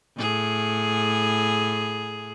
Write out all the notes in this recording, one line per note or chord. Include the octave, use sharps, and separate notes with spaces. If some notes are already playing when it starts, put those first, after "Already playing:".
A2 G#4